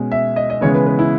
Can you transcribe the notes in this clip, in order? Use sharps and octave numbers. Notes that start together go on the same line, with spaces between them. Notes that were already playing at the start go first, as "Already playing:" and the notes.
Already playing: B2 G#3 C#4
E5
D#5
D#5
C#3 E3 G#3 B3 C#5
B4
B4
E4